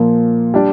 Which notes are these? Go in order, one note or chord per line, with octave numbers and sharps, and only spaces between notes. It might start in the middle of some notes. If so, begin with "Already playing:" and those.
Already playing: A#2 F3 A#3
G3 D4